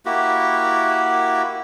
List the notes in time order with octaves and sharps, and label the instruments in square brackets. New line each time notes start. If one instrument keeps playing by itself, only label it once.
[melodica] A#3 E4 F#4 G4